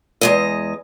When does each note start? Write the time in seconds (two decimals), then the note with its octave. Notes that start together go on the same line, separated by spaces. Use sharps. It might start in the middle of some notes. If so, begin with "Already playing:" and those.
0.21 E2 G#3 D#5